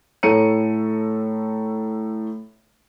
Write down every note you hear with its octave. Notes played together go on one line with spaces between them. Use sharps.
A2 A4 C#5 A#5 C#7 D#7